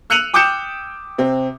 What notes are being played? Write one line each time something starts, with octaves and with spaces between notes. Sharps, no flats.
E6 F#6 C#7 D#7 F7 F#7
G5 D6 D#6 G6 C#7 E7
C3 C4